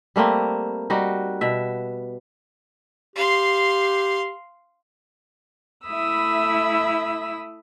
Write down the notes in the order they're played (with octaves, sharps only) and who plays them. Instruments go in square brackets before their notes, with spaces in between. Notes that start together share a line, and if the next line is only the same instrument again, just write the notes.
[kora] G3 A3 A#3 C4
G3 D#4 F#4
B2 E5
[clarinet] G4 [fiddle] F5 C6
[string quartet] A3 E4 E5 B5 D#6 E6